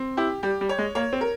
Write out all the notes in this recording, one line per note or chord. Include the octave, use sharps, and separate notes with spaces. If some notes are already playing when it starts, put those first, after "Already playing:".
Already playing: C4
E4 G4
G3 G4
G3
C#5
G#3
A#3 C#5
C4
A#4